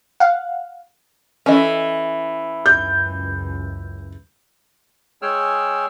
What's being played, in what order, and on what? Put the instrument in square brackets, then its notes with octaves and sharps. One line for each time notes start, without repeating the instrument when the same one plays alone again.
[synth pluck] F5 F#5
[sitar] E3 [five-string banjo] C#4 A4 D#5
[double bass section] C#2 F#2 [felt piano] G6
[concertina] G#3 G#4 C#5 G5 E6 F6